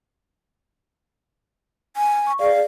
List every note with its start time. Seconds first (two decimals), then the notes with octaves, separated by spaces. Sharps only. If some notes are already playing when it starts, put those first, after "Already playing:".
1.97 G#5
2.27 C#6
2.39 G#4 D5 F5